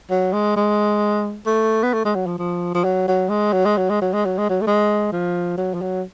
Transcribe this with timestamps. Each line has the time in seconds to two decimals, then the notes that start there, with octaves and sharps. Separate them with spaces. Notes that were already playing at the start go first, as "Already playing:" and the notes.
0.10 F#3
0.33 G#3
0.56 G#3
1.47 A3
1.83 B3
1.93 A3
2.05 G#3
2.15 F#3
2.27 F3
2.39 F3
2.75 F3
2.84 F#3
3.08 F#3
3.29 G#3
3.53 F#3
3.65 G#3
3.77 F#3
3.89 G#3
4.01 F#3
4.13 G#3
4.25 F#3
4.38 G#3
4.49 F#3
4.61 A3
4.67 G#3
5.12 F3
5.58 F#3
5.74 F3
5.82 F#3